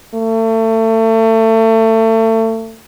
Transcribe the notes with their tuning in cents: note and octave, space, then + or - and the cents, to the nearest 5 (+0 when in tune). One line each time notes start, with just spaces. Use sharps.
A3 +30